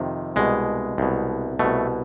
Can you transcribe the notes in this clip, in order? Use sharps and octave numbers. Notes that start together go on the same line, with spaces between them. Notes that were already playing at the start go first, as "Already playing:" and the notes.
Already playing: F2 C3 D#3
C2 B2 G#3
C2 B2
C2 B2 A3